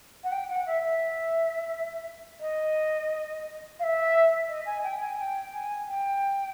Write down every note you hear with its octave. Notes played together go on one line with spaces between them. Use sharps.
F#5
G5
F#5
E5
E5
D#5
F5
E5
D#5
G#5
G5
G#5
G5
G#5
G5